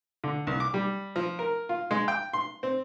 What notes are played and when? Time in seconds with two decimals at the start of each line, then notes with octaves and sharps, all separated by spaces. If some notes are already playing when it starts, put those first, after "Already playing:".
0.24 D3
0.47 C2
0.60 D6
0.74 G3
1.16 F3
1.39 A#4
1.69 F4
1.91 G#3
2.08 G5
2.33 C6
2.63 C4